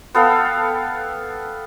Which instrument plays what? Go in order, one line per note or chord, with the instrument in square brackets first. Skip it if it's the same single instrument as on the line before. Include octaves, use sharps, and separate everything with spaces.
[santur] B3 A4 F5 G5